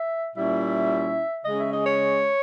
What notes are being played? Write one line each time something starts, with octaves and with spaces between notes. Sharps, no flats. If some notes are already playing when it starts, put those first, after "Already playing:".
Already playing: E5
A#2 G3 C#4 E4 E5
C#3 G#3 C#4 D#5
E5
D#5
C#5